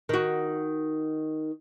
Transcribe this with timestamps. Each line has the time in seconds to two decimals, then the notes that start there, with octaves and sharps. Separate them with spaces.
0.09 D#3 F#4